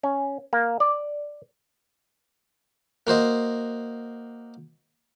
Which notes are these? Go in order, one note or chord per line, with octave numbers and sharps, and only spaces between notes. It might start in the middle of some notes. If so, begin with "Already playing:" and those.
C#4
A#3
D5
A#3 F#4 C5 D#5